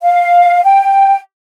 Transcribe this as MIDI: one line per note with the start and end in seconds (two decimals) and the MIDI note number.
0.03 0.62 77
0.64 1.18 79